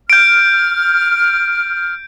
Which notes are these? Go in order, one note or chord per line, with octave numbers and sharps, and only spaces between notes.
F6 G6 D7